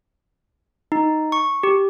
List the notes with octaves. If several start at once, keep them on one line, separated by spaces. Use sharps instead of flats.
D#4
C#6
G4